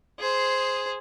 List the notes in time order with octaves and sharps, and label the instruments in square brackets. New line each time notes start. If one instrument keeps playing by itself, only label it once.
[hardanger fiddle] G#4 C5